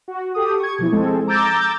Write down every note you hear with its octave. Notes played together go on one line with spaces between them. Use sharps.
F#4
G4 A4 D#6
C#6 G#6
B2 F3 E4
F3 G#3 C4 A4
A#5 D6 E6 G6 A6